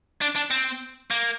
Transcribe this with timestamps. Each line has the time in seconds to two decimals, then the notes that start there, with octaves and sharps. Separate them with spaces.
0.21 D4
0.35 D4
0.50 C4
1.11 A#3